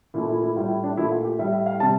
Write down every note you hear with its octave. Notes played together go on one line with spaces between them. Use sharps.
A#2 A3 E4
E4
E4
A2 G3 F4
E4
D4
A#2 A3 E4
F4
G4
A2 G3 E5
E5
F5
C3 G3 A5